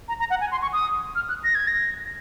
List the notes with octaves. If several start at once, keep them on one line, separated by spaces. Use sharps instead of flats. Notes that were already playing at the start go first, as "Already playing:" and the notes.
A#5
A#5
F#5
G#5
C6
C#6
D#6
F6
F#6
A#6
G#6
A#6